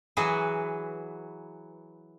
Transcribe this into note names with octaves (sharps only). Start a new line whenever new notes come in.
E3 F#3 F#4 G#4 B4